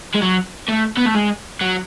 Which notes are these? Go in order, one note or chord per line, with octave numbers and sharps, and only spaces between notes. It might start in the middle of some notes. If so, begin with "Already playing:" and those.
G#3
F#3
A3
B3
A3
G#3
F#3